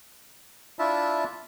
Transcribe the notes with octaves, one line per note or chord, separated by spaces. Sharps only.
D4 E4 F4 E5 A5